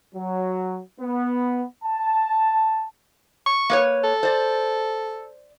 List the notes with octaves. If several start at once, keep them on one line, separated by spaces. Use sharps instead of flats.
F#3
B3
A5
C#6
A#3 B4 C#5
A4
C5 D5